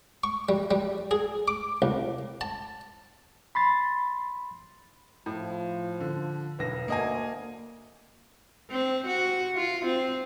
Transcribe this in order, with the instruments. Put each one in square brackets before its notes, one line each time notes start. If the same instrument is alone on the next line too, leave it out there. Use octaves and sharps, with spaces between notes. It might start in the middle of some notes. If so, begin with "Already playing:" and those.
[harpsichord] C#6
G3
G3
G#4
D6
C2
A5
[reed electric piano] B5 C6 A6
[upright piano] A2 [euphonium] F3
[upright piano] D3
[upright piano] E1 B1 A#6 [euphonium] B4
[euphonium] D2 [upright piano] A#3 D#5 G#5
[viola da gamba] C4
F#4
F4
C4